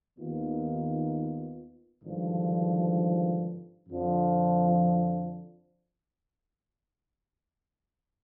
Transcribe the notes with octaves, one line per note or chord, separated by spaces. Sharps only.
D#2 D#3 B3 F4
G#1 G2 D3 F3
F2 D3 F3